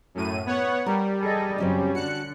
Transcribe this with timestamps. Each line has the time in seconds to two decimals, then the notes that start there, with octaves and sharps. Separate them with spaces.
0.15 F#2 A2 D#7
0.46 B3 C#5 F#5
0.86 G3 A#4
1.20 G#4 A4 D#5
1.58 F#2 C#3 F#3 C4 C#4
1.95 D3 D4 F#4 F#6 C#7